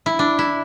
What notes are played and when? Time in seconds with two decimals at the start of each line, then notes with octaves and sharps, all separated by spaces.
0.06 E4
0.19 D4
0.39 E4